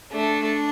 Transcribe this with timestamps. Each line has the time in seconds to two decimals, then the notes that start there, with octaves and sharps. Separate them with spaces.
0.12 A3 D4